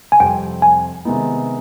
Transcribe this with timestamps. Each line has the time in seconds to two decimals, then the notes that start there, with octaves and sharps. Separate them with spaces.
0.12 G#5
0.20 F2 C3 G3 C4 G4 G5
0.62 G#5
1.05 C3 D#3 G#3 B3 D#4